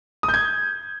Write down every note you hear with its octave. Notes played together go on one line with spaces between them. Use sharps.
D#6
G6
G#6